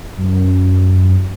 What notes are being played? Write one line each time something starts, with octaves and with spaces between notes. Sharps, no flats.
F#2